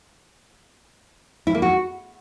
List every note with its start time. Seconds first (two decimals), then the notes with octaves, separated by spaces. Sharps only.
1.47 E4
1.54 A#3
1.62 F#4